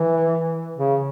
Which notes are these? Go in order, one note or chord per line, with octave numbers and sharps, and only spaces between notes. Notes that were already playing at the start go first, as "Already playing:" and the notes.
Already playing: E3
C#3